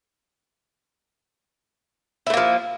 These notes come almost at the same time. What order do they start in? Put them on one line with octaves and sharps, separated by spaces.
E4 A3 A#3 F3